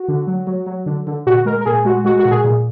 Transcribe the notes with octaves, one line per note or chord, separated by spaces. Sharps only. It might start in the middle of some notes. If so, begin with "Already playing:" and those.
Already playing: F#4
D3
F#3
F#3
F#3
D3
D3
A#2 F#4
G#3 A#4
A#4
A#2 G#4
G#3 F#4
G#3 F#4
F#4
A#2
G#4
A#2